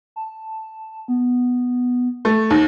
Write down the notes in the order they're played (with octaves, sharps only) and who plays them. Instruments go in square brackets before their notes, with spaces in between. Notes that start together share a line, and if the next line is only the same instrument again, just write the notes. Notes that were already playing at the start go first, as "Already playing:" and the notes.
[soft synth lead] A5
B3
[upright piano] A3
[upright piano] D#2 [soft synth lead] A#6